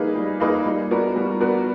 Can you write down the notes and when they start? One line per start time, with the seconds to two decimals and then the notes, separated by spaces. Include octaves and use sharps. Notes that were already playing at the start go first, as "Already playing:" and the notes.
Already playing: G3 A#3 D#4 G#4 B4
0.15 G3
0.40 A#3 D#4 G#4 B4
0.66 G3
0.90 B3 D4 F#4 A#4
1.16 G3
1.40 B3 D4 F#4 A#4